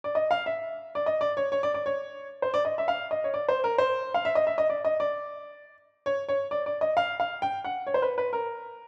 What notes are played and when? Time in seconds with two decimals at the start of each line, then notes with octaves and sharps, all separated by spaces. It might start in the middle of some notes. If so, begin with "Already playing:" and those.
0.04 D5
0.15 D#5
0.31 F5
0.46 E5
0.95 D5
1.06 D#5
1.21 D5
1.37 C#5
1.52 C#5
1.63 D5
1.74 D5
1.86 C#5
2.42 C5
2.54 D5
2.65 D#5
2.78 E5
2.88 F5
3.11 D#5
3.24 C#5
3.34 D5
3.49 C5
3.64 A#4
3.78 C5
4.14 F5
4.25 E5
4.35 D#5
4.47 E5
4.58 D#5
4.70 D5
4.85 D#5
5.00 D5
6.06 C#5
6.28 C#5
6.51 D5
6.66 D5
6.81 D#5
6.97 F5
7.20 F5
7.42 G5
7.64 F#5
7.87 C#5
7.94 C5
8.02 B4
8.18 B4
8.33 A#4